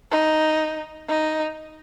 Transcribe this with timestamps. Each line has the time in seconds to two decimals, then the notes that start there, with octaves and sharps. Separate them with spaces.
0.11 D#4
1.08 D#4